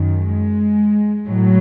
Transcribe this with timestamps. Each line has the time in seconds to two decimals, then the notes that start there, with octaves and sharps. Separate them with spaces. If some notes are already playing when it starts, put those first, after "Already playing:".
Already playing: F#2 D#3
0.19 G#3
1.28 A2 F#3